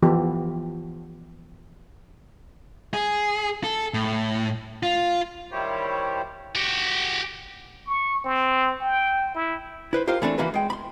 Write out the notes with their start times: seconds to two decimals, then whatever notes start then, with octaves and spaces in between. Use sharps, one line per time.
0.02 E3 F3 B3 F4 G4 A4
2.94 G#4
3.64 A4
3.94 A2
4.83 F4
5.52 D#3 G3 E4 G4 C5 C#5
6.55 F#4 G4
7.87 C#6
8.24 C4
8.81 G5
9.35 E4
9.93 E4 B4 C5
10.07 F4 G4 A#4 C5 F5
10.22 E3 A3 C4 D4
10.38 E3 A#3 F#4 B4
10.54 G#3 G5
10.70 B5 C6